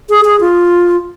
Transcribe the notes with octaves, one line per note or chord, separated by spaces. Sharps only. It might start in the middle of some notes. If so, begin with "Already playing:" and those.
G#4
G#4
F4